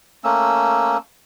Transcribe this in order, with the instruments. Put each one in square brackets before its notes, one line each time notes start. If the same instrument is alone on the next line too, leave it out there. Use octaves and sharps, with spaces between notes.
[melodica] A3 A#3 C#4 E6